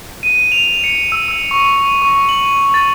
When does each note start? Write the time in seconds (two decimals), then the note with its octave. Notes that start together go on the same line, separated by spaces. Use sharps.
0.23 D#7
0.52 F7
0.84 C#7
1.12 E6
1.28 E6
1.51 C#6
2.02 C#6
2.29 F#7
2.74 A6